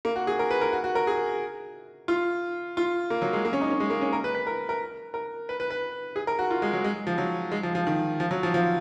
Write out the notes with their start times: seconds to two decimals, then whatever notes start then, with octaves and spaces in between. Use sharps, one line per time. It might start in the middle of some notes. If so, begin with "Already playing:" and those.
0.05 A#3
0.16 F#4
0.27 G#4
0.39 A#4
0.51 B4
0.61 A#4
0.73 F#4
0.84 F#4
0.95 A#4
1.07 G#4
2.08 F4
2.77 F4
3.10 A#3
3.22 F#3
3.33 G#3
3.45 A#3
3.53 C#4
3.61 D#4
3.70 C#4
3.80 G#3
3.90 A#3
4.01 C#4
4.13 A#4
4.24 B4
4.35 B4
4.47 A#4
4.69 A#4
5.14 A#4
5.49 B4
5.60 B4
5.71 B4
6.16 G#4
6.27 A#4
6.39 F#4
6.51 F4
6.62 G#3
6.73 F#3
6.84 G#3
7.07 F3
7.18 F#3
7.52 G#3
7.63 F3
7.75 F3
7.87 D#3
8.20 F3
8.31 F#3
8.43 F3
8.54 F3